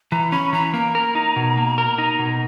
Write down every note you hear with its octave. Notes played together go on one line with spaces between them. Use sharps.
E3 A#5
C#4 B5
E3 A#5
A#3 A#5
A#4
D#4
B2
A#3
A#4
D#4
B2